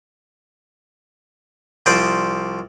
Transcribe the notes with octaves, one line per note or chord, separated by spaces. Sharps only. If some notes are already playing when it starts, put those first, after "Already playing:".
C2 F3 C5 D5 D6 D#6